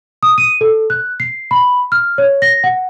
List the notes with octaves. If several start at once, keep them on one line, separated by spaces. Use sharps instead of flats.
D#6
D#7
A4
F#6
C7
B5
F6
C#5
A#6
F#5